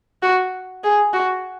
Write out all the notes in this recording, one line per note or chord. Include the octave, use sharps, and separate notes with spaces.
F#4
G#4
F#4